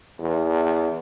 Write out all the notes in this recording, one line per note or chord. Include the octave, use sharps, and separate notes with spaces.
E2